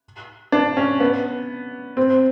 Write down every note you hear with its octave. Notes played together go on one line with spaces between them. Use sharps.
D4
C#4
B3
C4